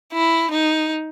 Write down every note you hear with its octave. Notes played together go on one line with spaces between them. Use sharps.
E4
D#4